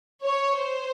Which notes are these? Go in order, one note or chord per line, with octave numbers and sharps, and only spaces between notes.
C#5
C5